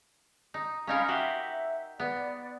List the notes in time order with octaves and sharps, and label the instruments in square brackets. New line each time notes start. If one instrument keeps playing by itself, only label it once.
[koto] D#4
[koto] C#4 D#4 A#4 [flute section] F5 B5
[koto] F#4 G4 C5 [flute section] E5
[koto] B3 [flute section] D5